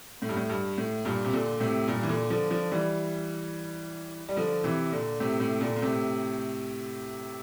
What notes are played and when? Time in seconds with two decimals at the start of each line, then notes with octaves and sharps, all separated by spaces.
0.22 A2
0.29 G2
0.36 A2
0.50 G2
0.78 A2
1.05 G2 A#2
1.25 C3
1.33 A#2 D3
1.60 A2 C3
1.88 G2 A#2
2.03 E3
2.09 A#2 D3
2.30 D3 F3
2.50 D3 F3
2.71 E3 G3
4.29 G3
4.37 D3 F3
4.64 C3 E3
4.92 A#2 D3
5.20 A2 C3
5.40 A2 C3
5.61 A#2 D3
5.76 A#2
5.82 A2 C3